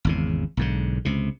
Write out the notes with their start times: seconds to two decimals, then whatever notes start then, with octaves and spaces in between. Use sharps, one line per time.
0.05 G#1 E2 C#3
0.57 B1 G#2 D3
1.05 C#2 C3